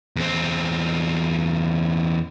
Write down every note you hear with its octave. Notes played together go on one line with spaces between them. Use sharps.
E2 C4